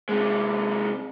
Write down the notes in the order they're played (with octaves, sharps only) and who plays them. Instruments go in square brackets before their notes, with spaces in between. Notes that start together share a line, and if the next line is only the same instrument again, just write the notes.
[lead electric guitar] C3 G#3